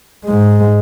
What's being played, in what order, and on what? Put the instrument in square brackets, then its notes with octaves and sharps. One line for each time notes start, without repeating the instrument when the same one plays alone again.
[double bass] G#2 G#3